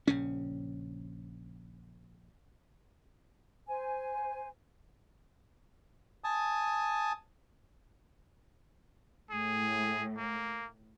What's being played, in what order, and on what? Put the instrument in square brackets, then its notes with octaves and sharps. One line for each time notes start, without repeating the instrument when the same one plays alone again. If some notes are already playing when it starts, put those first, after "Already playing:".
[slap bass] A#1 C#3 C#4
[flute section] C5 G#5
[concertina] G#5 A5 D#6
[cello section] A2 [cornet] G#4
[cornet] A#3